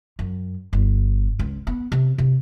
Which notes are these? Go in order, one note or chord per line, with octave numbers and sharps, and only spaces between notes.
F#2
G1
C#2
B3
C3
C3